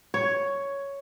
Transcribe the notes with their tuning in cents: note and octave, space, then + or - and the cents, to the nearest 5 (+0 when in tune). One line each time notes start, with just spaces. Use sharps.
C#5 +5